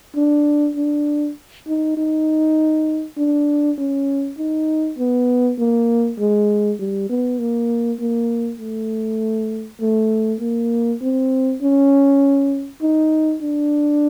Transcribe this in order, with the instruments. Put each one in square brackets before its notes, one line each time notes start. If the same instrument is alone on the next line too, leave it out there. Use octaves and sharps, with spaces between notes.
[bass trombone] D4
D4
D#4
D#4
D4
C#4
D#4
B3
A#3
G#3
G3
B3
A#3
A#3
A3
A3
A#3
C4
C#4
D#4
D4